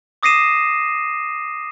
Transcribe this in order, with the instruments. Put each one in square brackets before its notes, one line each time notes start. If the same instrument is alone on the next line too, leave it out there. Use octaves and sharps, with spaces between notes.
[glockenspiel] D6 D#6 A#6 C7 D#7 E7